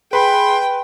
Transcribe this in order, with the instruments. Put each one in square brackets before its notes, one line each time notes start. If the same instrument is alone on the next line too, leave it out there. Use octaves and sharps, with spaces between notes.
[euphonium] G#4 [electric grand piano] B4 B5 [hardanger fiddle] G5 [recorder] C6